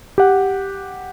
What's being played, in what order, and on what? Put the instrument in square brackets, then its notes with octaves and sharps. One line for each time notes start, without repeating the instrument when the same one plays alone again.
[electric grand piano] G4 F#5